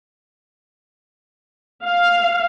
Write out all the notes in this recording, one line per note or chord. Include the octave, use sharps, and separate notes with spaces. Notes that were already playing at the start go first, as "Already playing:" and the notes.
F5